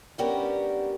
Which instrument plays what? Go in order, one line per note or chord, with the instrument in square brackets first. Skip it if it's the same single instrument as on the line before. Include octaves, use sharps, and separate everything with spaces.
[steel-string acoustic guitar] G3 B3 C#4 D4 G4 A#4